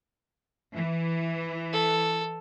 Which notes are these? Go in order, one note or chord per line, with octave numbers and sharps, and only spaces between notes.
E3
A4